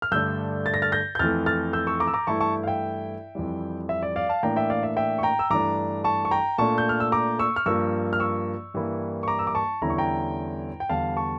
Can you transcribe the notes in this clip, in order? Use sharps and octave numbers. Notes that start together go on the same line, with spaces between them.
F6
G2 D3 A3 D4 E6 G6
A6
A#6
F6 A6
G6 A#6
G6
F2 E3 A3 F6 A6
F6 A6
E6 G6
C#6 E6
A#5 D6
E6
A#5 D6
G2 E3 A3 E4 A5 C#6
A5 C#6
F5
E5 G5
F2 E3 G3
E5
D5
D5 F5
F5 A5
A2 E3 A#3 D4 G5 A#5
E5 G5
D5 F5
E5
E5 G5
C#6
G5 A#5
E6
G2 E3 A3 D4 A#5 D6
A5 C#6
C#6
G5 A#5
A#2 A3 D4 A5 C#6
G6
F6
E6
A#5 D6
C#6 E6
F6
G2 F3 A#3 C#6 E6
F6
C#6 E6
G2 E3 G3 A#3 E4
C#6
A#5 D6
E6
D6
A5 C#6
E2 D3 G3 C#4 E4 A#5
C#6
G5 A#5
G5
E2 D3 G3 F5 A5
A5 C#6